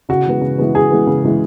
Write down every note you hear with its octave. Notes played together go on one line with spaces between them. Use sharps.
C#3 F#4
E3 G#3 B3
C#3
E3 G#3 B3
C#3 G#4
E3 G#3 B3
C#3
E3 G#3 B3